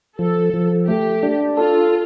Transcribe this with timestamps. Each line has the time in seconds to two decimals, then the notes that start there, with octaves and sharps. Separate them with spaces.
0.18 F3 A4
0.54 F3
0.87 A3 G4
1.23 D4
1.57 F4 A4